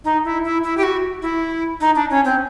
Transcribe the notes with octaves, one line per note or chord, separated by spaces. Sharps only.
D#4
E4
E4
E4
G4
F#4
E4
D#4
D4
C#4
C4